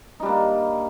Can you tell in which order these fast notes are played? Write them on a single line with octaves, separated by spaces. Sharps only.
D#4 G3 D4 A#3